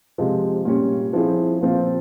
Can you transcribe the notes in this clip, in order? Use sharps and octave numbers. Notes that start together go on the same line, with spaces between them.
C3 F3 G#3
A#2 G3 C#4
F3 C4 E4 G#4
A#2 F3 C4 F4